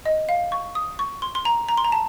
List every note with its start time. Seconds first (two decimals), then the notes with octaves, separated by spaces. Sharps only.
0.05 D#5
0.29 F5
0.52 C#6
0.75 D#6
0.99 C#6
1.22 C6
1.35 C6
1.45 A#5
1.69 A#5
1.77 C6
1.85 A#5
1.92 A5